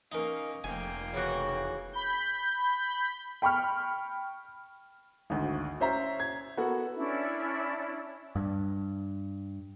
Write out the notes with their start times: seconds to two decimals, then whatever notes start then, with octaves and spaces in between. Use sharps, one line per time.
0.12 A#3 C#4 D#4 A#4
0.64 F1 A#3 G5 G#5
1.13 C#3 E3 F#4
1.93 B5 G6
3.42 G5 B5 C#6 F6
5.30 G#1 D2
5.80 C#4 C5 E5 A#5
6.20 G#6
6.57 B3 F#4 A4 A#4 F#5
6.96 C#4 D4 E4
8.36 G2